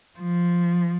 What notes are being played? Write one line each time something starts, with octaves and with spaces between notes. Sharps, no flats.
F3